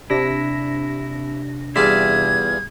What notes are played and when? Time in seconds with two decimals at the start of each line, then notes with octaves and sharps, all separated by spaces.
0.10 C3 D4 E4 A#6
1.76 E2 G3 F4 G#4 E5 G#6